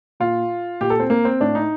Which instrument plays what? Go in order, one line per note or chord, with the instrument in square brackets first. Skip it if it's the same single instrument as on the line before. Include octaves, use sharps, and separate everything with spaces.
[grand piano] A#2 F4
A#2 G4
A4
C4
A#3
C4
A2 D4
D#4